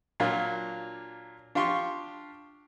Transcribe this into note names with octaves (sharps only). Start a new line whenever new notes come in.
A#2 F#3 D4 F4
D4 F4 G4 C6 C#6